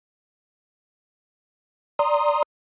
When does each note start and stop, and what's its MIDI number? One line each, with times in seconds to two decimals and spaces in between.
1.99 2.43 74
1.99 2.43 82
1.99 2.43 84
1.99 2.43 87